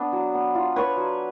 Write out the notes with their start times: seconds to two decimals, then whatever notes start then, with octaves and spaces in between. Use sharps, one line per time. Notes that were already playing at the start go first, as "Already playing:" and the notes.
Already playing: B3 D4
0.13 F#3
0.34 B3
0.55 F4
0.76 D4 B4 C#5
0.97 F#3